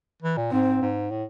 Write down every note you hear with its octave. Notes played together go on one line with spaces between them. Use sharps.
E3
A#2
G#2 C4
G#2
A2